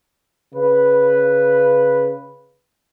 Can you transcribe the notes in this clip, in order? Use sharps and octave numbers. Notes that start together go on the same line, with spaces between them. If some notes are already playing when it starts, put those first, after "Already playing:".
C#3 B4